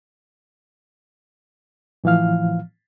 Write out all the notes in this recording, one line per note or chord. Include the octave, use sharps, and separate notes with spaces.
A2 E3 F3 F5 F6